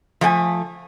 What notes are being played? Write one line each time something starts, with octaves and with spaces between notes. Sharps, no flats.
F3 A3 G5 G#5